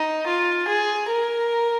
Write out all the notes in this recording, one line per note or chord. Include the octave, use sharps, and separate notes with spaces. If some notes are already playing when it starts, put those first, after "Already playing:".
Already playing: D#4
F4
G#4
A#4